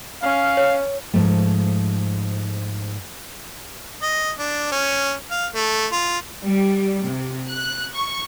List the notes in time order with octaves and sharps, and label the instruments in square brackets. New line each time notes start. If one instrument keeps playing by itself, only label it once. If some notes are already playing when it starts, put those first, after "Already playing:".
[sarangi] C#4 [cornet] F5
[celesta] C#5
[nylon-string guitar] G#2 F3 A3
[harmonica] D#5
D4
C#4
F5
A3
F4
[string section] G3
C3
F#6
C#6